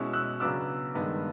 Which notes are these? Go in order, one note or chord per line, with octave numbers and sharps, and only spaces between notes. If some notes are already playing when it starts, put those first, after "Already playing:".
Already playing: B2 G#3 C#4 E4 E6 F#6
E6 F#6
C#3 F#3 B3 D4 D6 E6
G2 D#3 G#3 B3